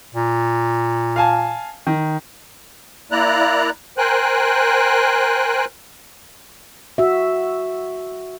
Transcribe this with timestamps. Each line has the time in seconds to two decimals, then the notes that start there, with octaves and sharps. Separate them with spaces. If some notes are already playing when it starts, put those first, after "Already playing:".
0.15 A#2
1.16 F5 G#5 A5
1.87 D#3
3.11 A#3 E4 D5 A#5 F#6
3.98 A#4 C5 G5 G#5 F#6
6.98 F#4 E5